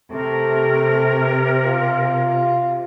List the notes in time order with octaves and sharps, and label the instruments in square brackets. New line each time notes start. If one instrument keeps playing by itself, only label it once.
[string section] C3 [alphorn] A3 [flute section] A#4
[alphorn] F4